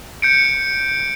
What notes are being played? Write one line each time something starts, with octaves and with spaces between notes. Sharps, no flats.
G6 C#7 D7